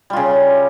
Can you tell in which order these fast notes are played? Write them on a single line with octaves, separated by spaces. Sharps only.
G3 F4 C#3